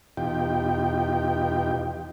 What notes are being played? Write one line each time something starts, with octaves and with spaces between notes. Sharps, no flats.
E2 B2 D#4 F4 G4 G5